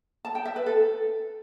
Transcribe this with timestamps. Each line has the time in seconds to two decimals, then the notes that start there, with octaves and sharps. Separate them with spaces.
0.25 A5
0.35 G5
0.45 E5
0.56 B4
0.66 A4